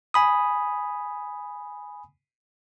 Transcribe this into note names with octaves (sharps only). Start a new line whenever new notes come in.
G#5 B5 D#6